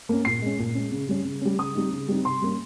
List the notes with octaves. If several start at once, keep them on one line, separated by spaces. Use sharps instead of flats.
A#3 C#4
A#2 C7
G#3 C#4
A#2
G#3 C#4
C#3
G3 C#4
C#3
G3 C#4
C#3 D#6
G3 C4 D#4
C#3
G3 C4 D#4
C3 C6
G3 A#3 C#4